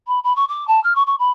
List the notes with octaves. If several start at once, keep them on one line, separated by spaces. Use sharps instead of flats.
B5
B5
C#6
D6
A5
F6
C#6
C#6
B5